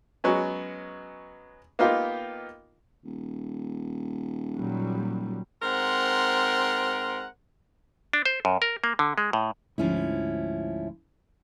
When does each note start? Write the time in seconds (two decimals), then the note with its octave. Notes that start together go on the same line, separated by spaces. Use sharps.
0.24 F#3 G#3 B3 C#4
1.79 A#3 B3 D#4 F4 G4
3.04 D#1
4.57 A#2 F#3 G3
5.62 G#2 C4 A#4 F#5 C6
8.13 D4
8.26 C5
8.45 F#2
8.62 A#4
8.84 A#3
8.99 D3
9.18 G#3
9.33 A2
9.78 D2 G#2 F3 C#4 E4